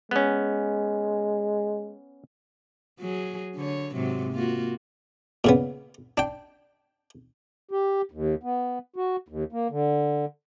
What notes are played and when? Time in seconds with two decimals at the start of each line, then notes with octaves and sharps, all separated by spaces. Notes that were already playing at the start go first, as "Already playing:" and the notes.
0.11 G#3 B3 C#4
3.00 F#3 G#4
3.56 D3 C#5
3.95 G#2 C3 F#3
4.33 A#3 F4 F#4
5.44 A#2 C#3 B3
6.18 D4 G5
7.71 G4
8.12 D#2
8.43 B3
8.96 F#4
9.28 D#2
9.52 A#3
9.70 D3